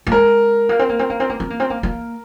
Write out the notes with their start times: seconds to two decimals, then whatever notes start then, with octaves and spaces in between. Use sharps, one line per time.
0.07 A#3
0.12 G#3 A#4
0.69 A#3
0.79 C4
0.89 A#3
0.99 C4
1.10 A#3
1.20 C4
1.30 A#3
1.40 C4
1.50 A#3
1.60 C4
1.70 A#3
1.83 A#3